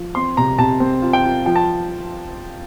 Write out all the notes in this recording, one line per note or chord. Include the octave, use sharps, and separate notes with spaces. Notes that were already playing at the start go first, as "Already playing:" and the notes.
Already playing: F3
C4 C6
C3 A#5
C3 A5
C4
F4
G5
F4
F3 G5
A5